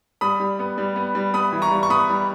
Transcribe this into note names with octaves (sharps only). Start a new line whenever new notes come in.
G3 B5 D#6
G3
B3
G3
B3
G3
B3 B5 D#6
E3
A#5 C#6
G3
C#6
B3 B5 D#6
G3